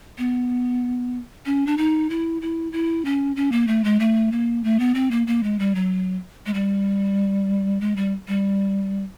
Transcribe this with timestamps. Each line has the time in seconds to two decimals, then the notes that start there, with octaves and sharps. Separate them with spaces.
0.18 B3
1.46 C#4
1.67 D4
1.77 D#4
2.10 E4
2.42 E4
2.72 E4
3.05 C#4
3.36 C#4
3.52 A#3
3.67 A3
3.84 G#3
4.00 A3
4.32 A#3
4.64 A3
4.80 B3
4.95 C4
5.11 A#3
5.27 A#3
5.43 G#3
5.59 G3
5.75 F#3
6.46 G#3
6.54 G3
7.81 G#3
7.96 G3
8.28 G3